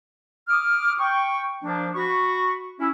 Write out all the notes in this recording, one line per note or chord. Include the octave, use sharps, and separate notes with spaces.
D6 D#6 F6
G5 C#6
F3 A#3 D4
F#4 B5 C#6
C#4 E4